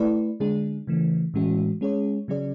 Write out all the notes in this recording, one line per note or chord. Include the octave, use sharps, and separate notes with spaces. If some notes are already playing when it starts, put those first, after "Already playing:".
Already playing: A3 E4 B4 D5
D3 G#3 D4 G#4
C#3 E3 A3
A2 E3 G#3 C#4 F#4
G#3 C#4 G#4 C#5
C#3 F#3 C#4 G#4 D5